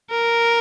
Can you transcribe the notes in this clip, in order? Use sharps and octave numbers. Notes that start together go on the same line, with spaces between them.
A#4